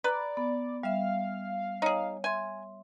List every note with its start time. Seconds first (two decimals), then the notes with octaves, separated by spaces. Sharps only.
0.04 B4 D5 A#5 B5
0.37 B3
0.83 G3 E5 F5
1.82 D#4 G#4 C#5
2.24 E5 G#5 C6